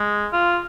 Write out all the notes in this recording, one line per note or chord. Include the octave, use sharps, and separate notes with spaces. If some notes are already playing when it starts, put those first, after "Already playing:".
Already playing: G#3
F4